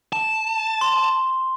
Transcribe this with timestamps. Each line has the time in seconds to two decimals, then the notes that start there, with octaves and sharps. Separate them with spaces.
0.13 A5
0.81 C6